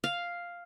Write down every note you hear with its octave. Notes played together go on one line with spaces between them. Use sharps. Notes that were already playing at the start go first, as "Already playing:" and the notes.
F5